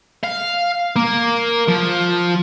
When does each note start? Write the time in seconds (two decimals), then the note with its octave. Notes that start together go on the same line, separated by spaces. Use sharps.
0.24 F5
0.96 A#3
1.68 F3